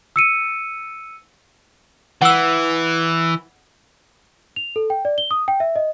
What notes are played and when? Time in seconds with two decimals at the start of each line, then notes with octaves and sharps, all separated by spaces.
0.16 E6 C#7 D#7
2.22 E3 F#5 E6
4.56 F7
4.76 A4
4.90 G5
5.05 D5
5.18 G7
5.31 D#6
5.48 G5
5.60 E5
5.76 D#5